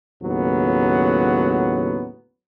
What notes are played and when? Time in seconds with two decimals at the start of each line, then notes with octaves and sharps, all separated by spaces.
0.22 D#2 A2 C#3 F#3 B3